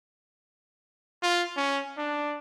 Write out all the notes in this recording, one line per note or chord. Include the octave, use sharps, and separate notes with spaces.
F4
C#4
D4